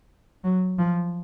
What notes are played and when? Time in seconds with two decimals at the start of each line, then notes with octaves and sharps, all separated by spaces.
0.44 F#3
0.78 F3